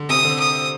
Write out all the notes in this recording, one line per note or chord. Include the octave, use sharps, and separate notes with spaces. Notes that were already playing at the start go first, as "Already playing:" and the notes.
Already playing: D3
C3 D#6
D3
D#6